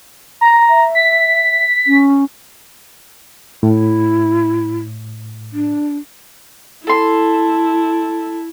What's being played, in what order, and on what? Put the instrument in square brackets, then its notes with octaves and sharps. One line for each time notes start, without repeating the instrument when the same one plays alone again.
[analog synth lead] A#5
[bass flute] E5
[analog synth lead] B6
[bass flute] C#4
[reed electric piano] A2 [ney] E4
[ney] D4
[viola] E4 [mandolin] A4 C6